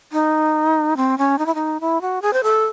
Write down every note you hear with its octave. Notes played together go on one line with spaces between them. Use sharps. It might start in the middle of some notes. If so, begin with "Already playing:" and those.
D#4
C4
C#4
D#4
E4
D#4
E4
F#4
G#4
C5
A4